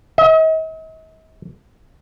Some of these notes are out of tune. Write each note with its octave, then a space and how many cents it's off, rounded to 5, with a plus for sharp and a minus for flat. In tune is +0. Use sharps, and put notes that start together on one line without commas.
D#5 +45